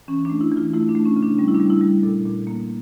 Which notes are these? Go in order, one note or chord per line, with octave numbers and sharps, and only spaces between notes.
E3 C#4
A3 D4
E4
E3
F4
A3 E4
D4
A3
C#4
C#3
D4
G3 C#4
E4
D4
G3
E4
G3
A#2 A4
A#2
A#3